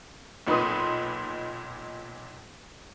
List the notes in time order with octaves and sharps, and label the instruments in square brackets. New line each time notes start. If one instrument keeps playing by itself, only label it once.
[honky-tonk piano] B1 A#2 D#4 B4 C6 D#6